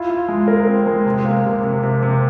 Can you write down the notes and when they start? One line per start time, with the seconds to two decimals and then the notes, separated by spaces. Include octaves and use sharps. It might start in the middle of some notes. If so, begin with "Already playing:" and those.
Already playing: E4 F4
0.10 F4
0.28 G#3
0.48 A#4
0.67 C4
0.86 G#3
1.06 C3
1.25 A#3
1.45 C3
1.63 C3
1.83 C3
2.03 C3